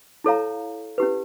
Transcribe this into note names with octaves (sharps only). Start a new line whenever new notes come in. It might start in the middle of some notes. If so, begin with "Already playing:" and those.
E4 A4 C#5 F5 A#5
C#4 E4 G4 B4